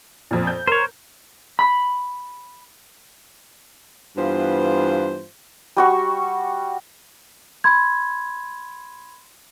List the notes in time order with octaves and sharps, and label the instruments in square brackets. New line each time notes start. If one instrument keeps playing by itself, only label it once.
[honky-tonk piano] F2 A#2
G6
[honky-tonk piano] A#4 [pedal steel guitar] C5 C#5
[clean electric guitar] B5
[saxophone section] G2 E3 B3 F4 C5 F5
[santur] G3 F#4 C#6
[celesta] B5 C6 G#6